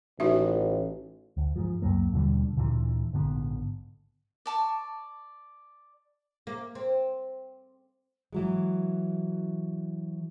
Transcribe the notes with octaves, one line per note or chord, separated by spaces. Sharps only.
A1 D#4 F#4 E5
D2
G#2 F3
C#2 F#2 F#3 A#3
D#2 B2 D3 G3
D2 A#2 D3 E3
A#1 G#2 D3 B3
D5 A5 C#6
A#3
C4
E3 F#3 G#3